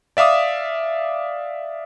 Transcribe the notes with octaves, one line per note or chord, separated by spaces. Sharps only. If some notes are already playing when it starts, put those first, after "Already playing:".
D5 E5 F5 D6 D#6